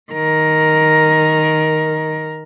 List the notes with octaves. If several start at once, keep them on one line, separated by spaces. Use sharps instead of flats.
D#3 A#4